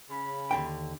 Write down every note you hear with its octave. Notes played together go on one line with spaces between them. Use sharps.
C#3 B5
D#2 D3 G5